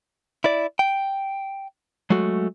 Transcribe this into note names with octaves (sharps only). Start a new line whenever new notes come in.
E4 D5
G5
F#3 G#3 A3 F#4